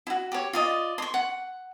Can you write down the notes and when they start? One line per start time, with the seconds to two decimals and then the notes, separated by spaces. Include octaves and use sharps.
0.07 E4 F#4
0.32 G4 C#5
0.53 F4 D5 D#5
0.98 C6 C#6
1.14 F#5